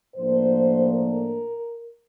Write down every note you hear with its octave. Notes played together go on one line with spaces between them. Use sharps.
A2 F3 A#3 D4 C5
A#4